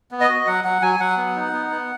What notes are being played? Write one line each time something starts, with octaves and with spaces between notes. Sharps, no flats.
B3
D#5
F#4
F#3 F#5
F#3 F#5
F#3 G#5
F#3 F#5
B3
D#4
B3
B3